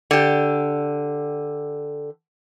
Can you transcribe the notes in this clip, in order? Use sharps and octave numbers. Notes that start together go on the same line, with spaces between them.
D3 G4